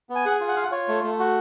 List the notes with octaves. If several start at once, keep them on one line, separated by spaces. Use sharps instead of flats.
B3
G#5
G#4 F#5
F4
F#5
F4 F5
F#5
F4 C#5
A3
A3
F#4